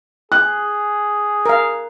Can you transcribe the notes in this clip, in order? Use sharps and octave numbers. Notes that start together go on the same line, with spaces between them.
G#4 F#6
A#4 F5